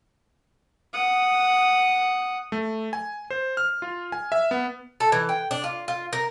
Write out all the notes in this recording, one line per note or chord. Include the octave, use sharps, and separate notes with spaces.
F#5 D#6
A3
G#5
C5
F6
F4
G#5
E5
B3
A4
E3
G5
D4
F4
F4
A#4